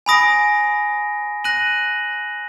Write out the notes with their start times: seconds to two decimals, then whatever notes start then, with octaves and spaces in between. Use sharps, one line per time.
0.06 G#5 B5 D#6 A#6 D7
1.44 F#6 A#6 D#7 F#7